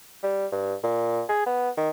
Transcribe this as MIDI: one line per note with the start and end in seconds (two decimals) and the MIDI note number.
0.23 0.46 55
0.52 0.75 43
0.83 1.22 46
1.29 1.42 68
1.46 1.70 59
1.77 1.90 51